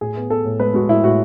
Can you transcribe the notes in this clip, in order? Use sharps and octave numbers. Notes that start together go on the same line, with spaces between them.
A2 G#4
B3
B3 A4
A2
G#3 B4
G#3 F#4
A2 E4
A2 F#4